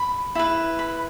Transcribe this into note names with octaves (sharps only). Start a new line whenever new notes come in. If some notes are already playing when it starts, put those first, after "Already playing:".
Already playing: B5
E4 B4
B5